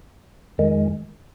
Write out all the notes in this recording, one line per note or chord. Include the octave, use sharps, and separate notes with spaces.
F2 D#3 G#3